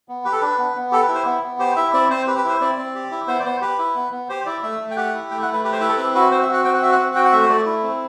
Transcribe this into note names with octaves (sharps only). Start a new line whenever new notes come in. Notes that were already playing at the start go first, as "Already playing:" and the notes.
B3
G4 B4
A4
D4 B4
B3
B3
G4 A4
B4
E4
C5
B3
B3
G4 C5
E4 E5
C4 D5
C4 C5
G4 B4
B4
E4 C5
C4 D5
C4
G4
E4
B3 C5
D5
B3 C5
G4 B4
E4
B3
B3
G4 C5
E4 D5
A3 E5
A3
G5
G4 F#5
E4
A3 G5
F#5
A3
B4
G4 B4
C5
E4 B4
A4
C4 B4
F#4 B4
C4 C5
E5
F#4
F#5
C4 G5
F#5
F#4 E5
F#5
C4
F#4 G5
F#5
A3 E5
C5
A3 D5
E4
C4